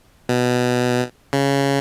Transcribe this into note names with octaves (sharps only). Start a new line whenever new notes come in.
B2
C#3